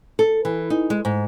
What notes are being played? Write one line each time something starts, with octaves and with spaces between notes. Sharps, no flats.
A4
E3
D#4
G#3
G#2